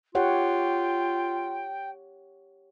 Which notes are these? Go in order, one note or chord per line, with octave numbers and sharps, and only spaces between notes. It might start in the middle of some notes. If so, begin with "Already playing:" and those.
F4 G4 C#5 F#5 G5